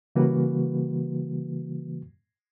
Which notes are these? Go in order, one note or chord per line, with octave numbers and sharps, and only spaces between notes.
C#3 E3 G3 A#3 F#4 B4